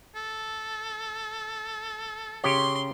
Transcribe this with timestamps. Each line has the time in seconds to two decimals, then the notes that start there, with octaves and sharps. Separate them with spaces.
0.15 A4
2.44 C#3 G4 C#5 C6